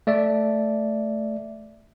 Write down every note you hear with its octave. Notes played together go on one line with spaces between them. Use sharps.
A3 D5 E5